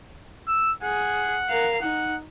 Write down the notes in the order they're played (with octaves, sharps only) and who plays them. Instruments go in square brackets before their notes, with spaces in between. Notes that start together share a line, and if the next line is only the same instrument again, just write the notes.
[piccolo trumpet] E6
[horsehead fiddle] G#4 [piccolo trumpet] F#5
[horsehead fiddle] A#4 F5
[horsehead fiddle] D#4 [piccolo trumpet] F#5